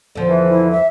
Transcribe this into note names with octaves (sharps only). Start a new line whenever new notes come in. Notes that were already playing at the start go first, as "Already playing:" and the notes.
E2 D3 F3
E3
E4
E5